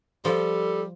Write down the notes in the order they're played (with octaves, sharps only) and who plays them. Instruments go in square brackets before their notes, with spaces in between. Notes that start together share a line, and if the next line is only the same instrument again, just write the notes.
[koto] F3 [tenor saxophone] G3 [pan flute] A4